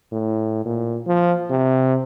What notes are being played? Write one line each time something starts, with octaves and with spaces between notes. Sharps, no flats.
A2
A#2
F3
C3